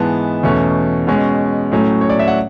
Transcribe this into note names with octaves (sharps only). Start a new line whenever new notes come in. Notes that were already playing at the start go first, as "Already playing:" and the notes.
Already playing: G#2 E3 G#3 B3 A5
E2 B2 A3 C#4
B2 G#3 C#4
A2 F#3 A3 C#4
C#5
D5
E5
F#5